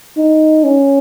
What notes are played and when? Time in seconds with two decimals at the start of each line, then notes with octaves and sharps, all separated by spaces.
0.17 D#4
0.64 C#4